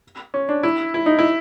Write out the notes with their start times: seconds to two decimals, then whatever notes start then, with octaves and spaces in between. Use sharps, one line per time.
0.34 C#4
0.49 D4
0.63 E4
0.94 E4
1.06 D#4
1.19 E4